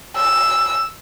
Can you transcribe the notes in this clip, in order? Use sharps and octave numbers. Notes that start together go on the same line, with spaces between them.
E6